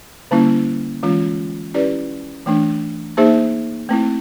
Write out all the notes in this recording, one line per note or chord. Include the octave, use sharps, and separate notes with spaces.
D3 G3 A#3 C#4 E4
E3 G#3 C#4 F4
C#4 E4 G4 B4 D5
E3 A3 D4
A#3 D#4 G#4 C5 E5
A3 C4 E4